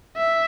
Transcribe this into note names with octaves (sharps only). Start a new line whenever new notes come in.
E5